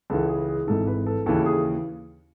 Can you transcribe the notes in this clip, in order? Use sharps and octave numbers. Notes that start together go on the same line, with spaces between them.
C#2 C#3 E3 A4
G#4
G#4
G#1 G#2 E3 A4
B4
A4
D#2 C#3 E3 A4
G#4